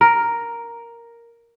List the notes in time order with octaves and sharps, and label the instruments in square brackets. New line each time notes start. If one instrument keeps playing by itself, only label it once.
[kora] A#4